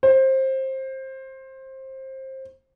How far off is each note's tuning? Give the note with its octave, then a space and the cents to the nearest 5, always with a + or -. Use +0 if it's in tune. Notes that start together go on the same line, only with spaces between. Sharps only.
C5 +20